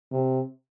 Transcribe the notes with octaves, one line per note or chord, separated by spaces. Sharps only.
C3